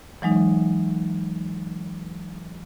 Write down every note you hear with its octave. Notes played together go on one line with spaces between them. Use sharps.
E3 F#3 G#3 D#4